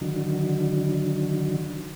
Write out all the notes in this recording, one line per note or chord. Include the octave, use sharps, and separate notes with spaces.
D3 D#3 F#3